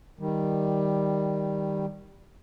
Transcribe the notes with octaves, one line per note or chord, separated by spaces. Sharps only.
D#3 G3